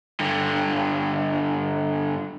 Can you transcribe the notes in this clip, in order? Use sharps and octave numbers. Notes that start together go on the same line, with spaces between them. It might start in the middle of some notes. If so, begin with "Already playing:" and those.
G2 D3